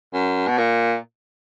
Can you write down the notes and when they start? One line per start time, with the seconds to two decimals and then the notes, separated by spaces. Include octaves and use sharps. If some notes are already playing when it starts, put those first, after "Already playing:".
0.14 F#2
0.48 B2
0.58 A#2